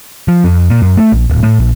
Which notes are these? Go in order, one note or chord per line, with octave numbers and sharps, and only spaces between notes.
F3
F2
A#2
F#2
A3
A#1
D1
A2
A#1